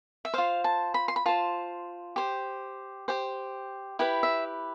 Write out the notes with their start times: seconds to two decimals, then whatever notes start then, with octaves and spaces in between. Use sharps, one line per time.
0.25 E5
0.34 F4 C5 F5
0.64 A5
0.94 B5
1.08 C6
1.16 B5
1.26 F4 C5 A5
2.16 G4 C5
3.08 G4 C5 G5
3.99 E4 G4 B4 G5
4.23 E5